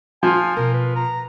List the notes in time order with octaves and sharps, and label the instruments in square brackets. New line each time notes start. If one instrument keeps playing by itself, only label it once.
[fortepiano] F3 F4 [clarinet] G#5
[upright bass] B2 [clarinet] A#4
[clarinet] B4
A#5